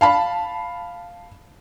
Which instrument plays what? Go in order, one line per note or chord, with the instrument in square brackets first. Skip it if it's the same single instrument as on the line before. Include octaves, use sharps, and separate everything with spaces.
[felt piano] F5 A5 B5